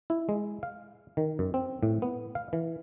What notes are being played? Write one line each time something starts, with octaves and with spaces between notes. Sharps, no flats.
E4
G#3
F5
D#3
F#2
C4
A2
B3
F5
E3